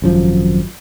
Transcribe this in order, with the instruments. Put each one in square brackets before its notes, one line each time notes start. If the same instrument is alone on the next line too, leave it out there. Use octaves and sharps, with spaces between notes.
[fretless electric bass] G#1 F#2 F3